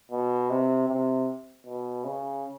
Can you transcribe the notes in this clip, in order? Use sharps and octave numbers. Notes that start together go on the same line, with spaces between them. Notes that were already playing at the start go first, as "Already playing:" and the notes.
B2
C3
C3
B2
C#3